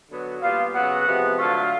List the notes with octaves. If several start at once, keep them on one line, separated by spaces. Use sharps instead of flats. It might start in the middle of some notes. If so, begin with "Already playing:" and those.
D3 F#3 B3
A#2 G3 B3 F4 F5
C#3 F#3 B3 F#4 F#5
C3 F3 G#3 B3
D3 F#3 A3 F4 F5